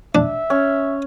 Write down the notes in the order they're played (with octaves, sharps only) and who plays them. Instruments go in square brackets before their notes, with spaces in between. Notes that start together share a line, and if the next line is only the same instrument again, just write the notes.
[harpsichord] D4 [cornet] E5
[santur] C#4